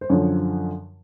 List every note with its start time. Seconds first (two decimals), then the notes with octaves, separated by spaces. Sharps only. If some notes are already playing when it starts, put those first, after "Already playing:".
0.01 C5
0.09 F#2 D3 F3 C#5